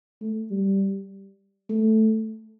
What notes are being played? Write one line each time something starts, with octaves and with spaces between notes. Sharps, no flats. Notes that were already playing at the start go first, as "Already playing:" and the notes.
A3
G3
A3